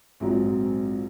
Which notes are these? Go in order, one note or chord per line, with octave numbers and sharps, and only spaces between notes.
A#1 G#2 F#3 C4